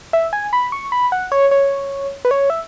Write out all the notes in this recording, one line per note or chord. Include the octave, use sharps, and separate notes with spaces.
E5
G#5
B5
C#6
B5
F#5
C#5
C#5
B4
C#5
E5